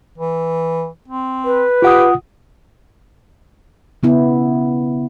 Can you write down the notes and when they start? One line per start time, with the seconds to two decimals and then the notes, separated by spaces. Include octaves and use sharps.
0.18 E3
1.08 C4
1.45 B4
1.82 F4 G4 F#5 D#6
4.03 C#3 B3 E4